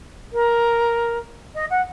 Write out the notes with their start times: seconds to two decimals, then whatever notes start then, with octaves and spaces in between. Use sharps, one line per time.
0.33 A#4
1.55 D#5
1.70 F#5